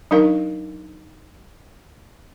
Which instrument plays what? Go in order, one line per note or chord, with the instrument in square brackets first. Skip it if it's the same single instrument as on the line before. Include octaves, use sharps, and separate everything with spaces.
[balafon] F#3 D4 D#4 A#4 F5